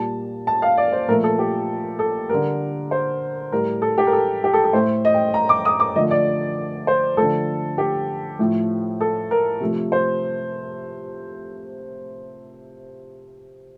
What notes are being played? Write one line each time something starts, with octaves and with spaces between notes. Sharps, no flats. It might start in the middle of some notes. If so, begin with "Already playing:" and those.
Already playing: A#2 G3 A5
A5
F5
D5
C5
A#2 F3 A3 A#4
A4
G4
A4
D3 G3 A#4
C5
A2 G3 A#4
A4
G4
A#4
A4
G4
A4
A4
A2 A3 C5
D#5
G5
A#5
D6
D#6
D6
D3 F3 A3 D#5
D5
C5
D3 F3 A3 A4
G4
A2 F3 A3
A4
A#4
C3 F3 A3
C5